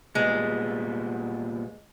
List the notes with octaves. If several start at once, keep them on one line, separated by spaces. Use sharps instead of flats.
A#2 G3 G#3 B3